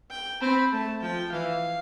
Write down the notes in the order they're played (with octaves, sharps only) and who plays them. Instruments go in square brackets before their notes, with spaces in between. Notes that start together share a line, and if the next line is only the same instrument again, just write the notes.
[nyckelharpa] G5
[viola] C4 [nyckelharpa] B5
[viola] A3 [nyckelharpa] A5
[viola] F3 [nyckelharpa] G5
[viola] E3 [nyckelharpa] F5